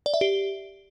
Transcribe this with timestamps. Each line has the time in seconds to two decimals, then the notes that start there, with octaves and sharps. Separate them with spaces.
0.06 D5
0.14 E5
0.21 G4